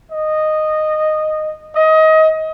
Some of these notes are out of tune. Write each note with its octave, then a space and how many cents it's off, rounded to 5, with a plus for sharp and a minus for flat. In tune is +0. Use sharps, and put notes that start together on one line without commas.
D#5 -10
D#5 +25